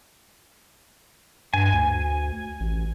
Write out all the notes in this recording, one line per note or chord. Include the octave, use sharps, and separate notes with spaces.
G2 G#5
D2
A1